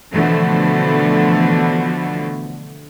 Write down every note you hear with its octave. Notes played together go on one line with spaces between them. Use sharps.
B2 D3 E3 F3 A3